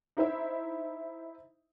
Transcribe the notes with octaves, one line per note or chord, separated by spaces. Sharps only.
D#4 E4 C5 E5